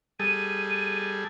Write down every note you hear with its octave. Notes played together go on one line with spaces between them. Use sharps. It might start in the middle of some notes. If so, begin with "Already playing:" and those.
G3 G#4 A4 D#7